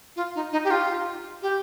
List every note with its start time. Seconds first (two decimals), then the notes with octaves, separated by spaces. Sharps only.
0.16 F4
0.35 D#4
0.52 D#4
0.64 G4
0.71 F4
1.42 G4